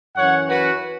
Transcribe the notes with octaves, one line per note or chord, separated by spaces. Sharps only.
F#2 E3 C#4 C#5 F#5
F#4 B4